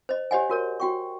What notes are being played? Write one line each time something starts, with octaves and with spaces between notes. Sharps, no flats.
C5 D#5
G4 C5 C#5 D#5 F#5 G#5
F#4 A#4 C#5
F#4 G5 C#6